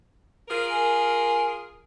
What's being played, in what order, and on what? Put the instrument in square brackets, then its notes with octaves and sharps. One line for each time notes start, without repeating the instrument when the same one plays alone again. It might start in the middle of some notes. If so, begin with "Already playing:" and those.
[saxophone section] F4 G#4 A#4
[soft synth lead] G#5